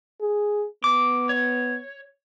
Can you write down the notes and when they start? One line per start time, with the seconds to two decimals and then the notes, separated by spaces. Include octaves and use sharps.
0.21 G#4
0.84 B3 D6
1.29 C#5